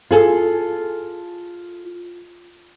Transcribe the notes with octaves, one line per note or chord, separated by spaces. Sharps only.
F4 G#4 A4